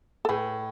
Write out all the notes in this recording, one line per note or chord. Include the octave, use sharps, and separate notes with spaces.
A4
A2 G#4 B4